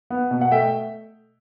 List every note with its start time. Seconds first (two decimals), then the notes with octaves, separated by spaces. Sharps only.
0.10 B3
0.31 B2
0.41 F#5
0.51 A3 E5 G5